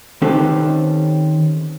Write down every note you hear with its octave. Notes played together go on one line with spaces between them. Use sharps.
D#3 C4 C#4 G4 A4 B4